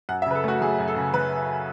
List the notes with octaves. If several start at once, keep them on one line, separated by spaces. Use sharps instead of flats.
F#2 F#5
E5
C#3 B4
A4
A3 F#4
F#3 G#4
F#2
A4
C#3
F#3 B4